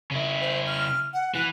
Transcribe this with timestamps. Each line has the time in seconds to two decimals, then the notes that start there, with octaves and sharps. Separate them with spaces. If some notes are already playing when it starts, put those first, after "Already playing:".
0.11 C#3 E4
0.42 C5
0.67 F6
1.13 F#5
1.35 E3 F#6